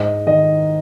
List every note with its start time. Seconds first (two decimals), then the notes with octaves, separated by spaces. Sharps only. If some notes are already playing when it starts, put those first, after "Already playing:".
Already playing: G#2 D#5
0.27 D#3 D#5